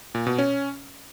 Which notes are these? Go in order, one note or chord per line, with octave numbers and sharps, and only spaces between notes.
A#2
B2
C#4